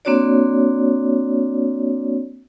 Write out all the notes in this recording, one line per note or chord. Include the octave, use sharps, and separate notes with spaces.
A#3 C4 D4 F#4 C#5 D5